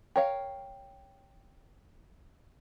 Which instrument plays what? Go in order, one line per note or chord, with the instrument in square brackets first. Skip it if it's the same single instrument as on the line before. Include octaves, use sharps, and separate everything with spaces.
[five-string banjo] A#4 C#5 F5 [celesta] G5